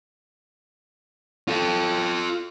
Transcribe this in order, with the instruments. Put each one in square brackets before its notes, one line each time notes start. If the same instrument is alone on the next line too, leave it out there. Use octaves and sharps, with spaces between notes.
[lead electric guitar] F4 A4